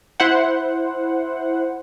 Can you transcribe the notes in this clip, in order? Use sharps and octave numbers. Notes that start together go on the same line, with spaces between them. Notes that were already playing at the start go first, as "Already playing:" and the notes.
E4 C5 F#5